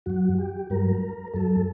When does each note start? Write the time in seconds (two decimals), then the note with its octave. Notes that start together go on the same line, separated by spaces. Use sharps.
0.06 F#2 F#3 F#4
0.38 G4
0.70 G2 F#3 A#4
1.33 F#2 F#3 A4